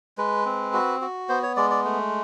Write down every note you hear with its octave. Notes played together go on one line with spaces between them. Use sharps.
G#3 B4
C4
F#4
F#4
B3 C5
C#5
G#3 D5
D5
A3